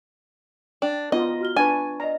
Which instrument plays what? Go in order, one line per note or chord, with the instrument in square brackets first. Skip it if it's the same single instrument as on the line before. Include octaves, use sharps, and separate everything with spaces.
[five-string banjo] D4 [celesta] G5
[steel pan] B3 D#4 F4 [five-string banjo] D#5
[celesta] F#4 F6 G7
[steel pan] D4 B4 [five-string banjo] G#5 [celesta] C#6 G#6 A6
[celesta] D5 D#5 [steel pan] A#5